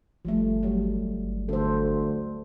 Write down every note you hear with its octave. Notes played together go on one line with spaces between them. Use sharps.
G1 F3 G3 A3
F#3 G3
G1
D2 A4 C5